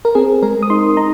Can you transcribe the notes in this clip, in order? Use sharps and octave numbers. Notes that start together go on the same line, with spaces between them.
A#4
C4 G#4
G#3 A#4
D#6
D#4 C6
D#4 A#5